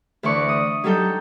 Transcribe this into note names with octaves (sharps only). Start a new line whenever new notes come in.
D2 E3 D5 C#6
D#6
F#3 G3 D#4 A4 G6